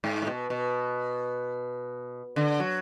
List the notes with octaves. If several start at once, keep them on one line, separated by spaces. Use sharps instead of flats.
G#2
A2
B2
B2
D3
F#3